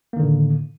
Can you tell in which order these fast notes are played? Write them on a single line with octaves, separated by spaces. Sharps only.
A#3 D#3 D3 A2